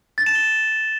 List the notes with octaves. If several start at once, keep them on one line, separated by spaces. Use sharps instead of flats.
A6
E7
G7